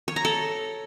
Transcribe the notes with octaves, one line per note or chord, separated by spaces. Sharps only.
C#5
A#5
A4